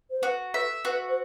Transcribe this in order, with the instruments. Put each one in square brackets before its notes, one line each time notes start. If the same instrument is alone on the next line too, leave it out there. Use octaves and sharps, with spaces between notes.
[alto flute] C5
[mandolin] F#4 [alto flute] B4
[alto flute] B4 [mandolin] E5
[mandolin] F#4 [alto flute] B4
[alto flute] C5